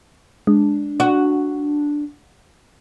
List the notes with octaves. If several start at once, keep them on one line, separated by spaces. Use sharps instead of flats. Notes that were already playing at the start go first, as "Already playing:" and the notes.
G#3 D4
F#4